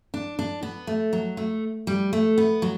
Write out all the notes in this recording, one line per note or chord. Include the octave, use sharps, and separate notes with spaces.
D4
D4
B3
A3
F#3
A3
G3
A3
B3
F#3